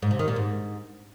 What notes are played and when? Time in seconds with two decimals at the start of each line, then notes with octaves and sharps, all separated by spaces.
0.02 G#2
0.11 C3
0.19 D#3
0.28 A#2
0.36 G#2